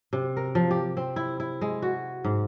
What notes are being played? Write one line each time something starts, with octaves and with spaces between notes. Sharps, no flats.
C3
A#4
F3
G4
C4
E4
E4
G#3
F#4
G#2